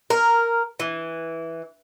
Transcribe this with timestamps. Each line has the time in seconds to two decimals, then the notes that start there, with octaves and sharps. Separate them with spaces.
0.10 A#4
0.80 E3